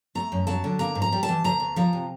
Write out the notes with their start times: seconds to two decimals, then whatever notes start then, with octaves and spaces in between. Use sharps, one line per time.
0.15 A3 A#5
0.32 F#2
0.47 F#3 A5
0.64 D3
0.79 A#3 A#5
0.95 G#2
1.02 A#5
1.12 G3
1.23 A5
1.29 E3
1.44 D2 A#5
1.60 D2
1.76 F3 A#5
1.93 C3